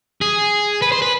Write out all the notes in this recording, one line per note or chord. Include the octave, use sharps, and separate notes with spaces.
G#4
B4
C5
B4